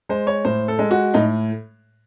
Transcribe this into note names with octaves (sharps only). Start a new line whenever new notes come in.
G#3 C5
C#5
A2 C5
A4
G#3
F#4
A2 D#4